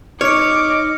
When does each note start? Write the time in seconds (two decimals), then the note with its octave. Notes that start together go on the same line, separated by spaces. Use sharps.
0.21 D#4 C#5 D6 F6 C#7